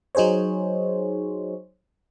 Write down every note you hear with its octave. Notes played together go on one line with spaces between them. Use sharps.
F#3 D#4 G#4 C5 C#5